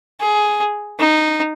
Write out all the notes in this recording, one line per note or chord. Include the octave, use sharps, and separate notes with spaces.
G#4
D#4